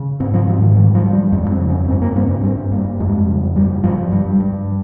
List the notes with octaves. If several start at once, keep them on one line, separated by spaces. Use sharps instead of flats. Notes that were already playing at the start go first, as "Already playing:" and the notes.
Already playing: C#3
G#2 C4
F3
G#2 F3
D#3
G2 D#3
F3
G2
G3
F2 G#3
C4
C#3
C#4
G2 C4
A#3
G2 C4
C#4
G2 C4
G2 A#3
F2 G#3
C#3
G2 G3
G2 F3
G2 G3
G2